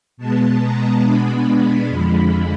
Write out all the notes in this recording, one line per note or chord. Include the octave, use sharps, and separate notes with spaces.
B2 G#3 B3 A5
A#5
B2 G#3 B3 D4 B5
F2 D3 F3 G#3